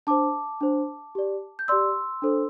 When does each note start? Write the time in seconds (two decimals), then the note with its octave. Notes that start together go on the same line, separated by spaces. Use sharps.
0.07 D4 C5 A5 D6
0.61 D4 C5
1.15 G4 D5
1.59 G6
1.68 G4 D5 C6 E6
2.22 D4 A4 C5